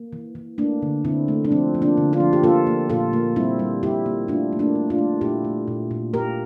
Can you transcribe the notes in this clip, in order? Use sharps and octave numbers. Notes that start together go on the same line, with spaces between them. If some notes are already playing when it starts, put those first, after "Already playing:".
Already playing: A#3
E3
E3
A3 A#3 D4
D3
D3 C4 E4
A3
D4
F3 C4
F3
A#3 D4
D3
D4 F4
F3
G4
A#3 F4 A4
A#3
A#2 F4 A4
A#3
G3 C4 E4
G3
G3 E4 G4
A#3
A3 D4 F4
A3
A#3 D4
A3
D4 F4
A3
A#2 E4 G4
A3
A#2
A#2
A#3 G4 A#4